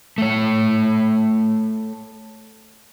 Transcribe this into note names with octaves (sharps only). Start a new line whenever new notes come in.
A3 C#5